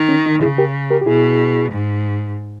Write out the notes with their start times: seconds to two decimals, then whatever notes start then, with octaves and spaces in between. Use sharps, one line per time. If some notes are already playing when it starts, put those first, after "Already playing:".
Already playing: D#3
0.09 C#4
0.26 D#4
0.42 C#3 E4 G#4
0.58 G4 A#4
0.90 G4 A#4
1.02 G4
1.06 B2 E4 G#4
1.72 G#2